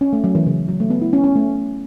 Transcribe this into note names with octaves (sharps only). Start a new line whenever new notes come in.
C#4
A3
F#3
E3
C#3
F#3
A3
B3
E4
C#4
C#4
A3